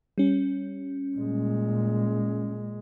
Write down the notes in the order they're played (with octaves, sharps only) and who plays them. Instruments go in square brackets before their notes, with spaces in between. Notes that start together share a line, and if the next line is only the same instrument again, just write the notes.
[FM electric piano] G3 C#4
[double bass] A#2 G#3